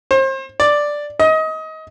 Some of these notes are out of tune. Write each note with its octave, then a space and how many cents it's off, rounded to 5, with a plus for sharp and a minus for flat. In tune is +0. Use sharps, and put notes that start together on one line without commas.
C5 +35
D5 +0
D#5 +25